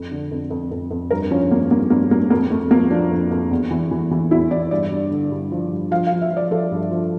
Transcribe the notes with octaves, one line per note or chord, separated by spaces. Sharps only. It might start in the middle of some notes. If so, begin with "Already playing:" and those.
Already playing: F2
D3
F2
F2
F2
F2
G2 A#4
F3 C#4
G2 A#3
G2 A#3
G2 A#3
G2 A#3
F2 A#3
F2 A3
F3 A#3
F3 D4
F2
F2
E2
E3
E3
E3
E2 E4
E3 D5
G2 D5
G2
D3
G2
F3
G2
F3 F5
F5
F3
E5
F3
D5
F3 A4
G2
F3